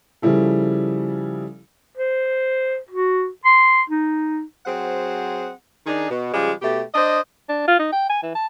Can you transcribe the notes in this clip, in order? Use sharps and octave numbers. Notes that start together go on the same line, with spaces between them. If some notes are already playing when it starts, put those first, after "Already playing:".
C#3 F3 G3 E4 A4
C5
F#4
C6
D#4
F#3 C4 G#4 C5 F#5
D#3 D4 D#4 G#4
B2
C#3 F3 G3 G#3
B2 A3 G4
D4 C5 D#5
D4
F4
D#4
G5
G#5
E3
A5